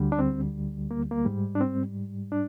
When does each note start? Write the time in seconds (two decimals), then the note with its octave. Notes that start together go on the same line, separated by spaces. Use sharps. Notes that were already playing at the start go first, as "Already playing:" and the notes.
Already playing: D2 D3 G3
0.12 D4
0.19 C4
0.91 A#3
1.11 A#3
1.25 G#2 G3
1.55 D4
1.61 C4
2.32 D4